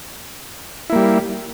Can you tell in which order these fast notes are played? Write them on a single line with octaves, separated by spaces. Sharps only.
E4 A#3 G3